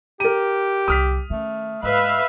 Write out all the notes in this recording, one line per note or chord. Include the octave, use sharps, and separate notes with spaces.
G4 A#4 D#7
C2 D3 D#6 F6 B6
D#3 A3 C#4
G#2 G#3 B4 E5 F5